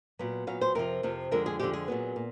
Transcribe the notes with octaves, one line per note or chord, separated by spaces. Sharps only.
A#2 F#3 B3
A#2 F#3 B3 F5
C5
F2 C3 F3 A#4
F2 C3 F3
F2 D3 F3 G#3 A#4
G#4
F2 D3 F3 G#3 G4
G#4
A#2 F#3 B3
A#2